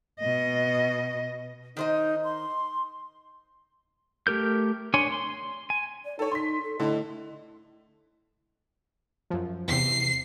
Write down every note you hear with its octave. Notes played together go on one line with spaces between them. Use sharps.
B2 D#5
D#3 D#4 C5 D#5
C6
A3 G4 A#4 G6
D4 C#5 G#5 C6
C6
G#5
D5
D#4 A4 C#5
D#4 C6 B6
A4
A2 D3 D#5
F#2 F3
E2 C3 C7